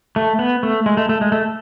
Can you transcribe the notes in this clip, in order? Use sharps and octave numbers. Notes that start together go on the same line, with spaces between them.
A3
B3
A3
G#3
A3
A3
G#3
A3